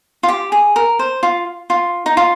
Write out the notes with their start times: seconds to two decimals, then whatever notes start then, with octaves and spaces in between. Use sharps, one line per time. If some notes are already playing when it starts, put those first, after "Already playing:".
0.23 F4
0.28 G4
0.52 G#4
0.76 A#4
0.99 C5
1.23 F4
1.70 F4
2.06 D#4
2.17 F4